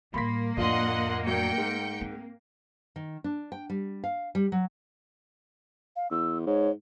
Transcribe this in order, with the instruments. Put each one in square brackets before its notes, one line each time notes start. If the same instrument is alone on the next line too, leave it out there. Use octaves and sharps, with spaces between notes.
[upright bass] A2 G3 [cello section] A#3 [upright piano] B5 C6 B6
[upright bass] F2 A2 [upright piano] D4 F4 [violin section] D#5 F#5 C6
[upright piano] F#3 D4 [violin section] G5 G6 C#7
[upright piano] G#2
[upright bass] C4
[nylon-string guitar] D#3
D4
G5
G3
F5
G3
F#3
[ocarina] F5
[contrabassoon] E2 [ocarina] E6
[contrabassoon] G#2 [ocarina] C#5